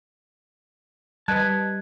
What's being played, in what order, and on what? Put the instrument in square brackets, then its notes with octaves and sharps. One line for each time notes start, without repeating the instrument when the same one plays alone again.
[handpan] G3 [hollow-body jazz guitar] B4 D#5 A5 [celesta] F#6 G#6